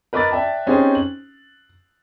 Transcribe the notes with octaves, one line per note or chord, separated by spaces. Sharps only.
A#4 B4 D#5 D6 F#6 A6
D5 E5 G5 A5
C4 C#4 D#4 G4 G#4 C5
F#7